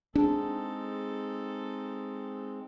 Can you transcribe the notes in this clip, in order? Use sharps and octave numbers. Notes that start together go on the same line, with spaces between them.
G#3 C4 D4 D#4 G#4 A4 A5